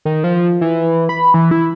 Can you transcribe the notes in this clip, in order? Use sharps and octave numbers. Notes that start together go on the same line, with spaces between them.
D#3
F3
E3
B5
E3
E4